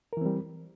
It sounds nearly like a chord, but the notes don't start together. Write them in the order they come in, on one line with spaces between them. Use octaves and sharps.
A#4 E3 C4 G3